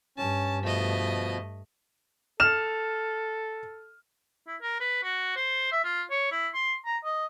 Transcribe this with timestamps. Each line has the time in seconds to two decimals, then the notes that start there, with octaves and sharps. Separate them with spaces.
0.18 G2 C#4 A5
0.63 B2 F3 A3 D#5
2.40 A4 F6 E7
4.47 E4
4.61 A#4
4.80 B4
5.03 F#4
5.36 C5
5.72 E5
5.84 F4
6.11 C#5
6.32 E4
6.54 C6
6.86 A#5
7.04 D#5